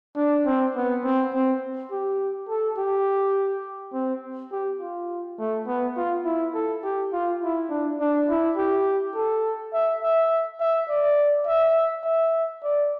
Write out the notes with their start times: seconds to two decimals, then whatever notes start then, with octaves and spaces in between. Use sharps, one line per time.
0.17 D4
0.46 C4
0.76 B3
1.04 C4
1.34 C4
1.91 G4
2.49 A4
2.78 G4
3.93 C4
4.52 G4
4.81 F4
5.39 A3
5.67 B3
5.97 F4
6.25 E4
6.55 A4
6.84 G4
7.13 F4
7.42 E4
7.70 D4
8.00 D4
8.29 E4
8.57 G4
9.15 A4
9.73 E5
10.03 E5
10.61 E5
10.89 D5
11.47 E5
12.05 E5
12.64 D5